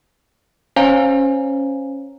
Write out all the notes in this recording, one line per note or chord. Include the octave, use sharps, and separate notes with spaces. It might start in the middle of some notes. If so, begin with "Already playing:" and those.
C#4 C5 C#5 F5 G#5 A#5